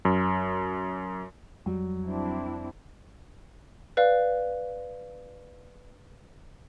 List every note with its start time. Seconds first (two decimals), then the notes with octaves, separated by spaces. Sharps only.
0.05 F#2
1.66 F2 F#3 G3
2.05 C4 D4 E4
3.97 B4 D5 F5